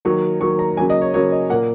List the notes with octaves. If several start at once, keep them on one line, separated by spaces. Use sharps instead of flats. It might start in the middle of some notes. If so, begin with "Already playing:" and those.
D#3 F#3 A#3 C#6
D#3 F#3 A#3 C#6
A#5
C#3 F#3 A#3 G#5
D#5
C#5
C#3 F#3 A#3 C#5
D#5
A#2 A#3 F#5